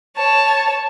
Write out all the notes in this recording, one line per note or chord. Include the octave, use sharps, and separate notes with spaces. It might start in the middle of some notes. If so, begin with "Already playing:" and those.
C#5 A5